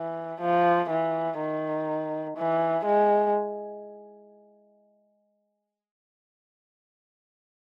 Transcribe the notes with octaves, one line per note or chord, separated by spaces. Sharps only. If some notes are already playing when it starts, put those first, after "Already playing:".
Already playing: E3
F3
E3
D#3
E3
G#3